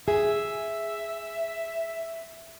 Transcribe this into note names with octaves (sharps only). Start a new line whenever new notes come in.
G#4 E5